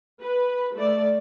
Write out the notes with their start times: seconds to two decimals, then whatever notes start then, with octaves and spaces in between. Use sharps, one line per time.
0.21 B4
0.75 A3 D5